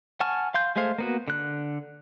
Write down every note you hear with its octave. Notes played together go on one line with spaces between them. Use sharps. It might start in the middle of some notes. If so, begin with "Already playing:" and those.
F#5 G#5 A5 C#6 F6
F5 C6 G6
G#3 A3 G#4 C5 F5
A#3 B3 F#4
D3 F#6